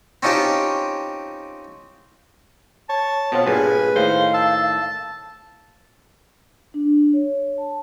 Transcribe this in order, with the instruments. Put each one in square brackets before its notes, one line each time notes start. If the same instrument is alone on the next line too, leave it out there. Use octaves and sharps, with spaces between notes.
[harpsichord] C4 C#4 D#4 F4 G4 A5
[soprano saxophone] C#5 [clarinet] A5
[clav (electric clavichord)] B2 C4 F4 [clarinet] B3 [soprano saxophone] A4 [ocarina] C#5
[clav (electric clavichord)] G2 A#2 [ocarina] G#4 [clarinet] B4 [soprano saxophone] G#5
[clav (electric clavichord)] A2 D#3 [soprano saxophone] C5 [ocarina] F5
[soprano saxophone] A5 [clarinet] E6
[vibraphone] D4
C#5
A5